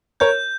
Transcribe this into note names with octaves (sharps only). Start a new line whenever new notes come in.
A#4 C#5 G6